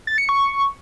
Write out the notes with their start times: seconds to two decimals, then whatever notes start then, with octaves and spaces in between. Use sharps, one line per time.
0.07 A6
0.18 C#7
0.29 C#6